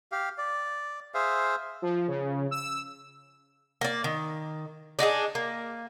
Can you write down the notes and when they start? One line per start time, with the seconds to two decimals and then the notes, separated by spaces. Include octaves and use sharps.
0.12 G4 F5
0.38 D5
1.14 G#4 C5 E5 F5
1.82 F3
2.08 C#3
2.51 E6
3.81 A#3 D5
4.04 D#3
4.99 D4 D#4 F4 G#4
5.35 A#3